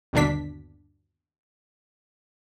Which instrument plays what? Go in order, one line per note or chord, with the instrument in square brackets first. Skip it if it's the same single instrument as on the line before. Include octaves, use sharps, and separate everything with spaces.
[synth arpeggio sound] G1 D#2 B2 D3 D4 B6